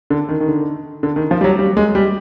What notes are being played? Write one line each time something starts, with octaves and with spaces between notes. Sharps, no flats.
D3
D#3
D#3
D3
D3
D#3
F3
G3
F#3
G3
G#3
G3